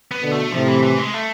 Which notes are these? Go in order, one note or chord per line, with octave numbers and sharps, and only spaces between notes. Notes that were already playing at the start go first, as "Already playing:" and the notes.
B3
B2 D3
A3
A2 C3 F3
E3
E3
G#3
A3